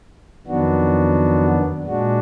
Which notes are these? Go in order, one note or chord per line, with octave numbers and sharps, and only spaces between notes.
F2 D#3 F#3 B3 D4 F#4
A#2 G#3 D4 F#4